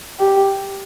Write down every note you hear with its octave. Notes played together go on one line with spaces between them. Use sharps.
G4